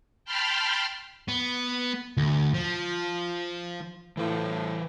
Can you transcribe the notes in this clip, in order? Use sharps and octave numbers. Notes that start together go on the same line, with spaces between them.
G5 A5 B5 C6 F6
B3
D2
F3
A2 E3 C5